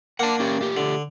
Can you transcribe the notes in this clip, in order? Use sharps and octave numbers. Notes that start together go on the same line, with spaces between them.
A#3 D4 F#5 A5
C#4 G4
A3 G4
D3